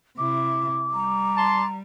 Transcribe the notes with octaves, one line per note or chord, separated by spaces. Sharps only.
C3 E4 D6
G3 A#5
A5 C6